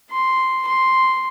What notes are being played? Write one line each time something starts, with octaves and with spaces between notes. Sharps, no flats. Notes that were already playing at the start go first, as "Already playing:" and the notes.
C6
C6